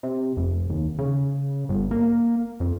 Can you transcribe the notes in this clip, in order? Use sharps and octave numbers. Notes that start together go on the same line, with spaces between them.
C3
F1
D#2
C#3
G1
A#3
F2